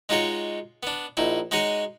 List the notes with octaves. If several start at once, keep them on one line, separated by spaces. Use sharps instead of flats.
G#3 D#4 F4 F#4 C#5
B3 D4
A#1 D#4 E4
G#3 D#4 F#4 C#5 G#5